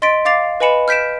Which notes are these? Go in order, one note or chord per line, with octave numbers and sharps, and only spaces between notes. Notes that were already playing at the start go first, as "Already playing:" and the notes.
D#5 C6 A6 B6 D7
F5 D6 A6 C7 F7
B4 D#5 G#5 B5 C#7 E7
F6 G6 B6 D7 E7